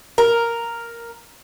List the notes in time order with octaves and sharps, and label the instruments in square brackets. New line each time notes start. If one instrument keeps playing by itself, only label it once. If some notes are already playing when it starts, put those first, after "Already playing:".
[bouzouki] A#4